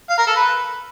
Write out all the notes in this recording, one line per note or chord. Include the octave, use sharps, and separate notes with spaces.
F5
A#4
A4
B4